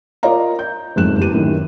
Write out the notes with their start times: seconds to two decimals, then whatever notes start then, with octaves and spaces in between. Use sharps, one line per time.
0.23 F4 A#4 D5 D#5 F5 A#5
0.59 G6
0.96 F#1 F2 G#2 G#3 F#6 E7
1.19 E2 G4 D#7
1.32 F#2 A2 D#3